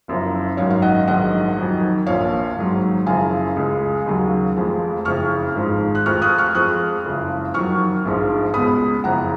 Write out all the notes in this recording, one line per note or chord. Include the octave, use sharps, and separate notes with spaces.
F#1 F#2 F3
G#1 F#2 D#3 F#3 C#5 F5
F5
D#5 F#5
A#1 G#2 D#3 F#3 D#5 F#5
F2 D#3 F#3
A#1 A#2 F3 C#5 F5
G#1 G#2 F#3
F#1 F#2 C#3 F3 F5 G#5
C#2 C#3 G#3
D#2 C#3 F#3
F1 F2 F3 G#3
F#1 F2 C#3 C#6 F6
G#1 G#2 F3 G#3
F#6
F1 F2 F3 C#6 F6
D#6 F#6
C#6 F6
F2 F3 G#3 D#6 F#6
F#1 F2 C#3 F3 G#3
F2 D#3 F#3 C#6 F6
A#1 G#2 F3 G#3
C#2 B2 G#3 B5 D#6
F#1 F2 C#3 F#5 A#5